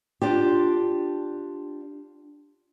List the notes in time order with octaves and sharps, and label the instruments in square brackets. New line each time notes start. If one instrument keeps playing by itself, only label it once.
[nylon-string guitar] D4 F4 G4